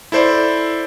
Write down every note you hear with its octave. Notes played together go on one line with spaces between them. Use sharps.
E4 A4 C5 D5